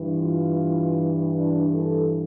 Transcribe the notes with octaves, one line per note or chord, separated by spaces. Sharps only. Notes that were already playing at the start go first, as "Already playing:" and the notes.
Already playing: G2 E3
F4
D4
A4